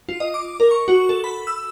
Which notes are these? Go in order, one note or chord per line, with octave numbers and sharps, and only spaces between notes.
F4
D#5
D6
A#4
C#6
F#4
A4
B5
E6